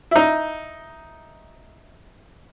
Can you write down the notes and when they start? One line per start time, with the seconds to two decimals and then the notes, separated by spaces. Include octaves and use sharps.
0.11 D#4 E4